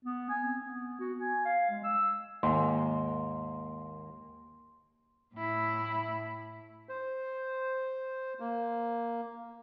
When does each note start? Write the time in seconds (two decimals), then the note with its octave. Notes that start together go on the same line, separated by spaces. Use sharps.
0.05 B3
0.29 G#5
0.44 C4
0.64 B3
1.00 F#4
1.19 G#5
1.45 F5
1.70 G#3
1.84 E6
2.43 D#2 G#2 A#3 C6
5.35 A2 E4
6.89 C5
8.40 A#3